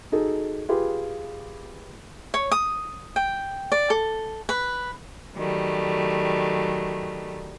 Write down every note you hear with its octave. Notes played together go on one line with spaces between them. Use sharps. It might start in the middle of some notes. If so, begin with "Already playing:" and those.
D#4 F#4 G#4 A4
F4 G4 G#4 B4
C#5
D#6
G5
D5
A4
B4
D#3 F#3 G3 A3